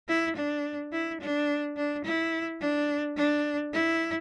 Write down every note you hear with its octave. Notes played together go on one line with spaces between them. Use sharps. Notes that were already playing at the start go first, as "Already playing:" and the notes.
E4
D4
E4
D4
D4
E4
D4
D4
E4